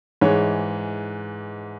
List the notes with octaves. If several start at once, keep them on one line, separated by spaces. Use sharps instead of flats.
G#2 E3 G#3 C#5